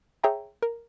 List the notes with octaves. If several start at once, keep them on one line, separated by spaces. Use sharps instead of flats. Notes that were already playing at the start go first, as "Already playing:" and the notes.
G#4 C#5 E5 G5 A#5
A#4